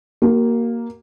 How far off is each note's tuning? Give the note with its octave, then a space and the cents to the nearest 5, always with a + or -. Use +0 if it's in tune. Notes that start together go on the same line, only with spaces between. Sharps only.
A#3 +0 F#4 +45